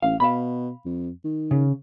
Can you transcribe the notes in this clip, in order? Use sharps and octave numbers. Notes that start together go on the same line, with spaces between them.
A1 F5
B2 F5 B5
F2
D#3
C#3